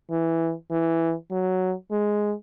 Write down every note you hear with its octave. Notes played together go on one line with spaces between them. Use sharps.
E3
E3
F#3
G#3